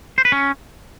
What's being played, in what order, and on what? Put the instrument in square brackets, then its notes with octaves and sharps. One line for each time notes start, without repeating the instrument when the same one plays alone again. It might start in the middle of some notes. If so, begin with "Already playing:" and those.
[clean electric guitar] C5
B4
C#4